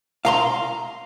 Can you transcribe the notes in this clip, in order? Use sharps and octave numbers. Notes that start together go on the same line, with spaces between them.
F5 A#5 C6